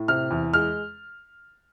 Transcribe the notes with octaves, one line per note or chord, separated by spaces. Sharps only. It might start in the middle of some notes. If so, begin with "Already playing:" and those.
Already playing: A2
C3 F6
E2
G#3 F6